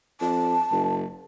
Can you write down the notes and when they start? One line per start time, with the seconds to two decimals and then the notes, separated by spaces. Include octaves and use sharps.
0.21 F2 A5
0.72 F#1